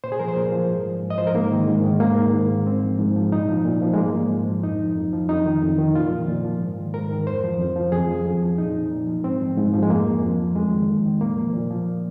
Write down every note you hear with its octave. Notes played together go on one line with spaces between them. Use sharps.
A#2 C5
G#4
F3 A#4
C5
A#2
F3
G#2
F3
G#2
D#5
F3 C5
A#4
G#2 A#3
D#3
G#2
D#3
G#2 A#3
D#3
G#2
D#3
G#2 C4
F3
G#2
F3
A#2 D#4
F3
A#2
F3
G#3
G#2 A#3
F3
G#2
F3
F2 D#4
F3
F2
F3
F2 D#4
D#3
F2
D#3
A#2 F4
F3
A#2
F3
G#2
D#3
G#2 A#4
D#3
F2 C5
F3
F2
F3
F2 G#4
F3
F2
F3
A#2 D#4
F3
A#2
F3
G#2 C4
F3
G#2
F3
G#3
F2 A#3
F3
F2
F3
F2 G#3
D#3
F2
D#3
A#2 A#3
F3
A#2
F3